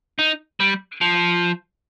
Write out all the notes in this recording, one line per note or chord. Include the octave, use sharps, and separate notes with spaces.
D#4
G3
F3